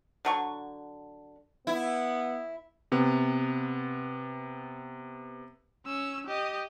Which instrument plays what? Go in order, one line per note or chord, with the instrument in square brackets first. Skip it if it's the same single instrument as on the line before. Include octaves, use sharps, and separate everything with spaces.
[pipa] D3 F#3 C#6
[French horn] B3 [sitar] E4
[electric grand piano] C3 B3
[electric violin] C#4 E6
G4 D#5